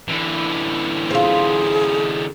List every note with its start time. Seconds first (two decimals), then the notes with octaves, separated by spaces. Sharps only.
0.08 D3 E3
1.11 C4 F4 G#4